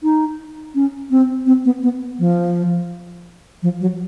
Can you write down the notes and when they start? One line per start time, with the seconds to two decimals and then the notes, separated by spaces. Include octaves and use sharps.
0.03 D#4
0.75 C#4
1.11 C4
1.46 C4
1.65 B3
1.83 B3
2.19 F3
3.63 F3
3.81 F#3